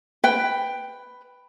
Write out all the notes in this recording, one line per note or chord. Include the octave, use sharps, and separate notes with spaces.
B4 G5